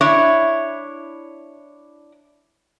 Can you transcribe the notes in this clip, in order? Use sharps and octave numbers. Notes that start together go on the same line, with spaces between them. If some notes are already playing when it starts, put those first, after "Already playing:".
D4 E4 C#5